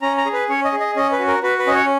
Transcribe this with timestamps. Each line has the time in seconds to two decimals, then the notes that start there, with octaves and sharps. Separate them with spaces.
0.02 C#4 A#5
0.18 A#5
0.26 G#4
0.33 B4
0.49 C#4 C#5
0.65 D#5
0.72 G#4
0.80 D#5
0.96 C#4 D#5
1.12 B4
1.19 F#4
1.28 A#4
1.43 F#4 B4
1.59 B4
1.67 C#4 D#5
1.74 C#5